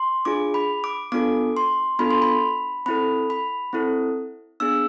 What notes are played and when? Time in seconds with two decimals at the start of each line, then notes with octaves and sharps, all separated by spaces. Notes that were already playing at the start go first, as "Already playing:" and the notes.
Already playing: C6
0.25 D4 F4 G#4 D6
0.54 B5
0.84 D6
1.12 B3 D4 F4 A4 D6
1.57 C6
1.99 B3 D4 F4 A4 B5
2.11 C6
2.22 B5
2.86 C4 E4 A4 B5
3.30 B5
3.73 C4 E4 A4
4.60 B3 D4 G#4 E6